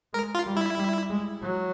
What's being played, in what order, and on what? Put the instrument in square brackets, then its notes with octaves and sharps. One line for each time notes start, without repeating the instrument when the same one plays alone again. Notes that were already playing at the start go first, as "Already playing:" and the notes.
[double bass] G#3 [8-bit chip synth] A#4
[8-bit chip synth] F4
[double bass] G3
[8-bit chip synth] E4
[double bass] G3
G#3
F#3